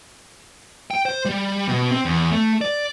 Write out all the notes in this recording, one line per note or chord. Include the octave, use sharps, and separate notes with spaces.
G5
C5
G3
B2
C4
E2
A3
D5